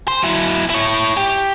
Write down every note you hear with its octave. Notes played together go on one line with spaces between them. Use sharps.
C5
F#3 E4
E4 C#5
G4